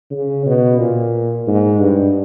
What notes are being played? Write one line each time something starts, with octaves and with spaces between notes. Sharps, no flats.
C#3
B2
A#2
G#2
G2